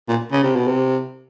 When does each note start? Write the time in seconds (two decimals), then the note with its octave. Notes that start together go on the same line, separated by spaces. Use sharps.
0.09 A#2
0.32 C#3
0.43 C3
0.56 B2
0.68 C3